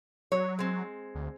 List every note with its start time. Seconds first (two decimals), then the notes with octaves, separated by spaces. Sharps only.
0.32 F#3 C#5
0.59 G#3 C4
1.15 D2